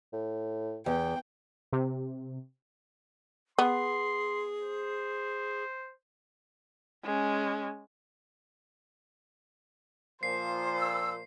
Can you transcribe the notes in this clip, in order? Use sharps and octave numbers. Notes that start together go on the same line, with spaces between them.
A2
E2 G5
C3
B3 G#4 C6
C5
G#3 C#4
A#2 F3 C5 C7
E6